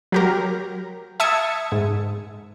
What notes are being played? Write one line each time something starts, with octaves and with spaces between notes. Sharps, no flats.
F#3 G4 A#4
E5 A5 D#6 E6 G#6 C#7
G#2